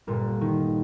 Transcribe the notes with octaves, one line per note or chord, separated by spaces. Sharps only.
G1 A#2
D#3